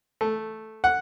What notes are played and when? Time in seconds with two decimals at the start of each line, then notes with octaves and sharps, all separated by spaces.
0.21 A3
0.84 F#5